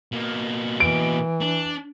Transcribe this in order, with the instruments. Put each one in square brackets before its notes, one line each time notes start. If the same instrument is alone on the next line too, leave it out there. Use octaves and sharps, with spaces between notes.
[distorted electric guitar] B2 A#3
[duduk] E3 [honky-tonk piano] D7
[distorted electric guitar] D4